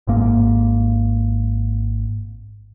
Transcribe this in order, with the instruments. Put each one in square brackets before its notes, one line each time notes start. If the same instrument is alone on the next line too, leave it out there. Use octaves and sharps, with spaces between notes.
[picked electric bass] G#1 G#2 A#3